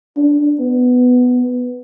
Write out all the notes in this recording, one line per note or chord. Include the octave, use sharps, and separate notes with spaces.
D4
B3